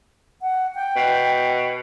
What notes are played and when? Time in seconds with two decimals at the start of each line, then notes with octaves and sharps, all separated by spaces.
0.42 F#5
0.75 G5
0.96 B2